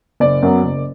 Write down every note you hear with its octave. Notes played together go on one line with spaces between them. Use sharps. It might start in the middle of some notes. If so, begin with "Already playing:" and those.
F#1 D5
F#2 F#3 B3
F#1